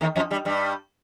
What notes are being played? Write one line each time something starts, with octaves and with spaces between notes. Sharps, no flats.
D#2 D#3
F2 F3
G2 G3
G2 G3